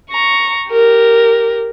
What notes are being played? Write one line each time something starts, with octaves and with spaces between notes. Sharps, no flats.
A#5 C#6
G4 A#4